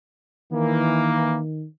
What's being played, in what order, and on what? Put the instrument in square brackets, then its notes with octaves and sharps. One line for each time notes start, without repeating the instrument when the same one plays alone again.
[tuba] D#3 [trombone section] E3 A#3